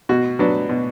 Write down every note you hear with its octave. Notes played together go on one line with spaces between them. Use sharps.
B2 F#4
F#3 B3 D4
B2